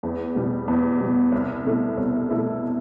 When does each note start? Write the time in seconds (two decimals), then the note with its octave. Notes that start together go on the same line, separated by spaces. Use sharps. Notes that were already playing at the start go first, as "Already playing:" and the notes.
0.03 E2
0.35 B2 G3 B3
0.68 E2
1.00 B2 G3 B3
1.32 C2
1.65 B2 A3 E4 A4
1.97 C2
2.29 B2 A3 E4 A4